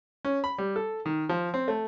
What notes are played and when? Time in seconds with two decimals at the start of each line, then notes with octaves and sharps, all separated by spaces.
0.25 C#4
0.44 B5
0.58 G3
0.76 A4
1.06 D#3
1.29 F3
1.54 C4
1.68 A3